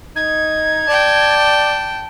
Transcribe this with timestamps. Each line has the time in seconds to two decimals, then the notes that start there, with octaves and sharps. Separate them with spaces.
0.15 D#4 G#6
0.87 D5 G5 A5